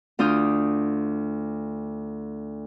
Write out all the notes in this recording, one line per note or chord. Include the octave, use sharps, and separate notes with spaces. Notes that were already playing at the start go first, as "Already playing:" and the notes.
D2 D4 F4 D#6 F6 G6